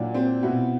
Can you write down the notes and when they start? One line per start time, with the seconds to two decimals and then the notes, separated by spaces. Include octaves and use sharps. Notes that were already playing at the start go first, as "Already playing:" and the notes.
Already playing: A#2 F#3 D4 E4
0.14 C4
0.43 B2 E4 F#4